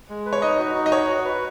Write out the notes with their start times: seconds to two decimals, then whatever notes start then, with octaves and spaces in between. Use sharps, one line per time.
0.09 G#3
0.26 B4
0.33 C#5
0.42 D#4 D#5
0.59 F#4
0.75 D#4
0.86 D#5
0.92 C#5 F#5
1.09 F#4
1.25 B4